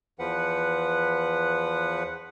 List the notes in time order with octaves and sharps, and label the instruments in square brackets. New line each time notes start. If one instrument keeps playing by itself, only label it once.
[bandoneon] E2 F3 B4 F#5